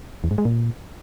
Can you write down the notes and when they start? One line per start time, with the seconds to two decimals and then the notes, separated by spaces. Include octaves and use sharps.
0.24 E2
0.31 G#2
0.38 G#3
0.45 A#2